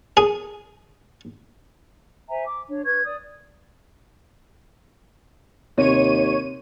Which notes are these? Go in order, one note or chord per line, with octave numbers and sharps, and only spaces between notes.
G#4
C5 E5 G#5 A#5
D6
D4 C#5
B4 C#6 G#6
D5 D#6
D#2 C3 C#5 D#7